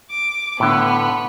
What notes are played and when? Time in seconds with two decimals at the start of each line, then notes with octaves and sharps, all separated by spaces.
0.11 D6
0.60 A2 D3 B3